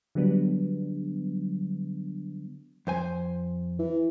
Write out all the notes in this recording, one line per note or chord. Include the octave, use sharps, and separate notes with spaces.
D3 F#3 G3 B3 D4
F2 C5 G#5
E3